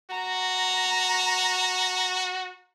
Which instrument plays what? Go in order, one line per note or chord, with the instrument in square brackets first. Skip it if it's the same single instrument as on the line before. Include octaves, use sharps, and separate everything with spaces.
[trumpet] F#4 [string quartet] A#5